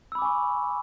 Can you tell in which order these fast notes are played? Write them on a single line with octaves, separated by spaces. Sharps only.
E6 B5 D6 G#5 C#6